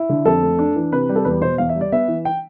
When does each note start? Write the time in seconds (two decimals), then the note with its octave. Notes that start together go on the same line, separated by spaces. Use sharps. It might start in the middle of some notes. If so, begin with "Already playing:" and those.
Already playing: E4
0.09 D3
0.25 F2 A4
0.43 A3
0.59 D4
0.76 E3
0.92 C3 B4
1.09 G3
1.15 A4
1.25 E2 B4
1.42 B2 C5
1.58 E2 F5
1.69 E5
1.76 G3
1.81 D5
1.92 B3 E5
2.08 E3
2.25 G5